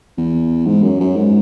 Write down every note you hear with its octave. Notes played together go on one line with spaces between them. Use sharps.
E2
G#2
F#2
F#2
G#2